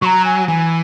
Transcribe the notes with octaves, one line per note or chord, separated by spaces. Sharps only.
F#3 A#5 C#6
G#5
E3 G#5